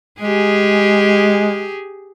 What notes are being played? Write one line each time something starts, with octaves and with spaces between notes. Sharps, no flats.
G#3 G4 G#4